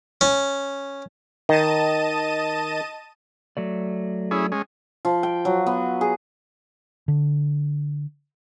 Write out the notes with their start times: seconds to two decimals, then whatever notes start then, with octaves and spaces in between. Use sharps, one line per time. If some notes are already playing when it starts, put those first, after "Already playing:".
0.21 C#4
1.49 D#3 D#5 A5 D#7
3.57 F#3 A3 D5
4.31 C#4 E4 G#4
4.52 G#3 C#4
5.05 F3
5.23 G5
5.45 F#3
5.66 B3
6.01 G#4
7.08 D3